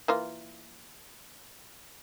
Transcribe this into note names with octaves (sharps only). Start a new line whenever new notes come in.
E3 A#3 F4